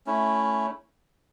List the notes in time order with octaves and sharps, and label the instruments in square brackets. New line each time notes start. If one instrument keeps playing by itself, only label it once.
[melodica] A3 C#4 E4